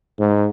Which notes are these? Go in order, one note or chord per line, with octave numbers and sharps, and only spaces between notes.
G#2